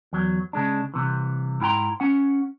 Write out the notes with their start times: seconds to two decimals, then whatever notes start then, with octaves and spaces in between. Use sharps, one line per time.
0.13 E2 F#3
0.53 C#3 G#3 D4
0.94 C2 C3 E3
1.60 G#2 E4 G5 A#5 C6
2.00 C#4 F#5